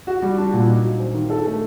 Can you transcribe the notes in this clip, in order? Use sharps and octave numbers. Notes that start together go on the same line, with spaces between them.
F#4
G3
D4
A#2
D#4
F#3
C4
D#3
A4
A3